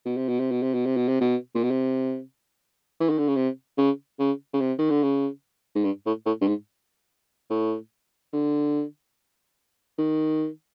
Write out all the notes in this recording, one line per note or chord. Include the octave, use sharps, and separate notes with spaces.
B2
C3
B2
C3
B2
C3
B2
C3
B2
C3
B2
A#2
B2
C3
E3
D#3
D3
C#3
C3
C#3
C#3
C#3
C3
D#3
D3
C#3
G#2
G2
A2
A2
G2
G#2
A2
D3
D#3